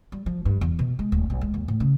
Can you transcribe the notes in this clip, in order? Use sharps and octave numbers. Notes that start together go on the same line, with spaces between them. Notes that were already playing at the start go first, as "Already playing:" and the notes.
G3
F3
G2
E2
B2
G#3
D1
B1
G#3
D#2
A2
C#3